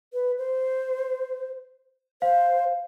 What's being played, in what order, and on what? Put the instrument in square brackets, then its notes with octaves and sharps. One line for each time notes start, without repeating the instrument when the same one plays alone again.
[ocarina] B4
C5
[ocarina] C5 [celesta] F5